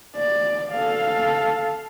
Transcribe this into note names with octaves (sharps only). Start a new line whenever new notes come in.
D5
A4 F5